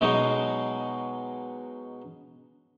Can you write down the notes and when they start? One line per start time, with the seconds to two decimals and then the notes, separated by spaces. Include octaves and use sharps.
0.01 B2 F#3 G#3 B3 D#4